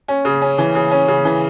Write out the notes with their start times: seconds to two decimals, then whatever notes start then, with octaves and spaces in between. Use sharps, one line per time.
0.08 C#4
0.25 C#3
0.41 C#4
0.58 E3
0.75 C#3
0.91 C#4
1.08 C#3
1.25 E3